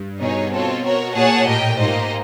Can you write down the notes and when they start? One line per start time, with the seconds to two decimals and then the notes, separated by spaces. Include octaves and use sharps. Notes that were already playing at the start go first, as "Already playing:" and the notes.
Already playing: G2
0.20 B2 D#4 G#4 C#5
0.52 C4 F4 A4 C#5
0.84 F#4 A#4 C#5
1.14 A#2 G#4 C#5 F#5 A5
1.46 A2 G4 A#4 D#5 G5
1.78 G#2 A#3 D#4 G4 C5 D#5